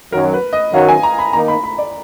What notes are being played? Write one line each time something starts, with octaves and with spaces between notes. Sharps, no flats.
F#2 D#3 F#3 A#4
B4
D#5
F#2 D#3 F#3 F5
G#5
A#5
B5
D#3 A#3 D#4 A#5
B5
B5
D5